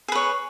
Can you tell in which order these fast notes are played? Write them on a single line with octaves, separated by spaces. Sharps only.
G#4 B4 C#5